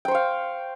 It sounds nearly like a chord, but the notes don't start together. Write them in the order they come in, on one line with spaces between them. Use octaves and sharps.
G5 C5 C#6 F5